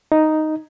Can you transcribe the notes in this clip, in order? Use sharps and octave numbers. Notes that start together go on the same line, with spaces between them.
D#4